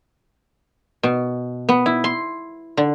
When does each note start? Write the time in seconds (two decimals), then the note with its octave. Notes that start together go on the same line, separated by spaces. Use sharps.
1.03 B2
1.69 B3
1.86 E4
2.04 C6
2.77 D3